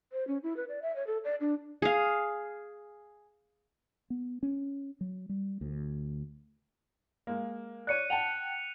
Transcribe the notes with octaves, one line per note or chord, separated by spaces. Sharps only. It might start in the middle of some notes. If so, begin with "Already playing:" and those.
C5
C#4
E4
B4
D5
E5
C#5
A4
D5
D4
G#4 F5
B3
C#4
F#3
G3
D2
G#3 A#3
C#5 D5 F#6 C#7 D#7
F#5 G5 A5 F7